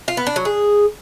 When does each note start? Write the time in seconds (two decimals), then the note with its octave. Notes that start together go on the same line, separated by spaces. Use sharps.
0.08 F4
0.17 B3
0.27 D4
0.36 F#3
0.45 G#4